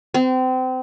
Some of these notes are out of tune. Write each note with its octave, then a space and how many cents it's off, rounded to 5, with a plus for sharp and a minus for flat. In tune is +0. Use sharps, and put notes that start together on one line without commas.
C4 -30